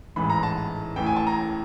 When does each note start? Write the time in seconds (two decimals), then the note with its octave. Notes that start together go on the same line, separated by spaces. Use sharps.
0.16 A1 G#2 E3 B5
0.30 A#5
0.43 A5
0.96 A1 A2 E3 G5
1.06 G#5
1.16 A5
1.27 A#5